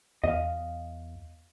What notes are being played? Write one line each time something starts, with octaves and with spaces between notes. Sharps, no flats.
E2 D#5 F5